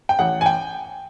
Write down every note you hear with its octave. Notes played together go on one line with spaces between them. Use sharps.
G5
A1 F#5
G#5
G5